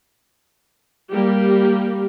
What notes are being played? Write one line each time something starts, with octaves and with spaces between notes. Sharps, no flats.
G3 A#3 G4